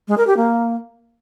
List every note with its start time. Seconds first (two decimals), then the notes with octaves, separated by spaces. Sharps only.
0.08 G#3
0.17 A#4
0.27 G4
0.37 A#3